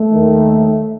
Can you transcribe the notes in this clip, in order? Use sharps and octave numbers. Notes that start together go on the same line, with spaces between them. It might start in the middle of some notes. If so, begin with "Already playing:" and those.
Already playing: A3
D#2 D#3